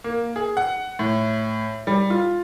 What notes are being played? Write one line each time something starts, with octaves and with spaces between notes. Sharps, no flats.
A#3
G#4
F#5
A2
G3
F4